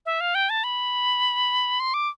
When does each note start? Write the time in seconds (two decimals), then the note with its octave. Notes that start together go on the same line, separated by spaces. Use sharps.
0.06 E5
0.21 F5
0.35 G5
0.50 A5
0.64 B5
1.80 C6
1.94 D6